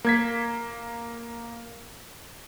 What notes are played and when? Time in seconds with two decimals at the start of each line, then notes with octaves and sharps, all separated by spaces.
0.04 A#3 G#6 B6